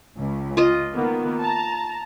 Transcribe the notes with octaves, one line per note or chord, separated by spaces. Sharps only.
C#2
F4 D#5
D#3 A#3 B3
A5 A#5